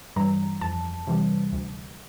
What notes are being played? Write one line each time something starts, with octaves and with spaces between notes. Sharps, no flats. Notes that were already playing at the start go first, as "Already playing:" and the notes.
G2 E3 G3 A#5
F2 A5
C3 E3 G3
D2